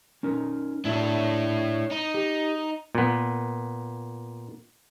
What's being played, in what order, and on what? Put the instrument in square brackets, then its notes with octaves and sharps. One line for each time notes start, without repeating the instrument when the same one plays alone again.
[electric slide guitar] C#4 D#4 A#4
[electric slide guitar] A2 D4 E5 [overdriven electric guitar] E4 C#5
[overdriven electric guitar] D#4
[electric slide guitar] G4
[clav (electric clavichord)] A#2 B3